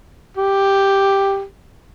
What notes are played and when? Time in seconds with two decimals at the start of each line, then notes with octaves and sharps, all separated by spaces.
0.37 G4